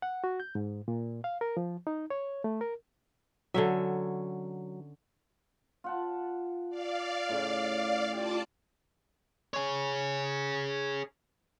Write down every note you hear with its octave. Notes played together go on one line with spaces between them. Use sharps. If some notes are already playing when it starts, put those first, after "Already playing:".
F#5
F#4
G6
G#2
A#2
F5
A#4
F3
D#4
C#5
A3
A#4
D3 F#3 C#4 E5
F4 F#5 A5
D5 F5
A2 C#3
F4 G4 D5 A5
G#4 C#5